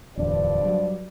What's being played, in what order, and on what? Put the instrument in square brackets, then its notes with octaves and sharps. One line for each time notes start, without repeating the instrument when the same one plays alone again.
[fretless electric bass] D1 E2 D4 [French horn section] G2 F3 D5
[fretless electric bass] F#3 G3